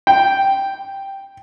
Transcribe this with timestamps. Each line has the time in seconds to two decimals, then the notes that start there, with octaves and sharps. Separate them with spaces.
0.07 G5